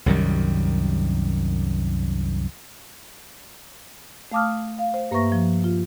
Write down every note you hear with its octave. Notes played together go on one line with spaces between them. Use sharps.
C2 F#2 D#3 G3
A3 F5 A5 D6 D#6 F6
F5
C5
G2 A#3 B4 E5 C#6 A#6
F3
F4